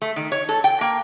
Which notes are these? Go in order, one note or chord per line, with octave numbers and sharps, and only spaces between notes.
A3
D#3
C#5
A4
G5
A#3